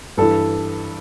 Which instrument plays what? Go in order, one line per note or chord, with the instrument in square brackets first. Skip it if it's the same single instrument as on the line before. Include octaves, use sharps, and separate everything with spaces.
[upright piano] G2 E3 A4